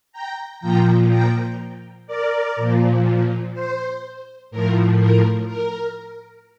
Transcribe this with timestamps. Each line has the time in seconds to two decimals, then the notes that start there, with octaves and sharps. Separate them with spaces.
0.12 G5 A#5
0.61 A#2 F3 G5 A#5
1.10 G5 A#5
2.07 A#4 D5
2.56 A#2 F3
3.53 C5
4.51 A2 F3 A#4
5.00 A#4
5.48 A#4